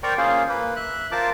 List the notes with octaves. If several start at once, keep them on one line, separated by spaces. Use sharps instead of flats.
A#4 C5 D5 G5 A#5 C#6
A#3 C#4 F4 G#4 C5 F5
A#3 B4
E5 F#6
F4 A#4 C5 A5 D6